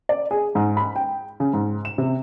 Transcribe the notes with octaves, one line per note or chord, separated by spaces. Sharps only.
D5
G#4
G#2
B5
G5
C#3
G#2
E7
C3